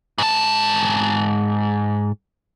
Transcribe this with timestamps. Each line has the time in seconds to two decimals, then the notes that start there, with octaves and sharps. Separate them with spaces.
0.18 G#2 A5